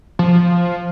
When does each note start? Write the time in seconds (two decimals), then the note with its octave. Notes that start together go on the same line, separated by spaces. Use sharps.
0.19 F3